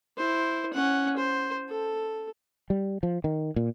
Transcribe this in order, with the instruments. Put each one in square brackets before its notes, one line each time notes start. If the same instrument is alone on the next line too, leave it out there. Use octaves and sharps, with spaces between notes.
[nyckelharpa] E4 C5
C#4 F#5
C5
A4
[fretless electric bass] G3
F3
D#3
A#2